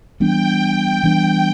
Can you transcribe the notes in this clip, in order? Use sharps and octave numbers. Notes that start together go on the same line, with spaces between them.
E3 G3 B3 D4 G5
E3 G3 B3 D4 G5